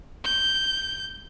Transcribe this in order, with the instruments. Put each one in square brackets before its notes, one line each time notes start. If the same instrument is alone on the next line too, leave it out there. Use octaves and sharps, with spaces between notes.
[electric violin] G6